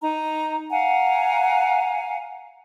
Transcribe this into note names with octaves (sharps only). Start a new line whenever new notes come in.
D#4 A#5
F5 F#5 G#5 A#5